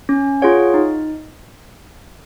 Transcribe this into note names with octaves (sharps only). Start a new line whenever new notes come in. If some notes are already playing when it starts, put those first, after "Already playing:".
C#4
F4 G#4 C#5 F#5
D#4